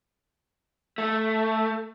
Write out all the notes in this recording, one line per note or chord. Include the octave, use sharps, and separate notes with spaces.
A3